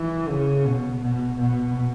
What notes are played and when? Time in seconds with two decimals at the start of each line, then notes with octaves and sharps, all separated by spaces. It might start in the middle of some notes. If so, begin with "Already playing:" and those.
Already playing: E3
0.29 C#3
0.66 B2
1.02 B2
1.38 B2